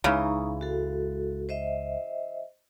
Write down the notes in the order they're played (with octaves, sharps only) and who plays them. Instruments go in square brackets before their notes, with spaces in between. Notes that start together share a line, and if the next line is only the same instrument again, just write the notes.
[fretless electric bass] C#2 G#3 [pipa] C#3 E3 [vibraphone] D#4 A#5 C#6
[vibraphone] F#4 A4
C5 D#5 E5